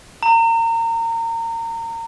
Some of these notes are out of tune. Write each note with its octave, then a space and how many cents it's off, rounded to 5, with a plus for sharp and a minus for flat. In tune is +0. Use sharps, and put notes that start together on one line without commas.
A#5 -30